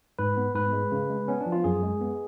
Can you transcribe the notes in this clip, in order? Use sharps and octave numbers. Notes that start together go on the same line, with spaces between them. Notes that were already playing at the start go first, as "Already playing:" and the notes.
G#2 B4
B3
G#2 B4
G#3
C#3
G#3
B3 C#4
D4
F3
F4
F#2 G#4
G#3
B3